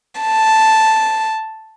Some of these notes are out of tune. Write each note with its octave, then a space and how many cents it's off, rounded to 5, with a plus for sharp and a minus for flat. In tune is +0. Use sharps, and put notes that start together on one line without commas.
A5 +0